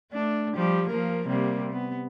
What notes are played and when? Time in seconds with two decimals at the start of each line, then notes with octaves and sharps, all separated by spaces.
0.13 A3 D4
0.55 F3 G3 G4
0.89 F3 A#3 A#4
1.27 C3 G3 A#3
1.72 B3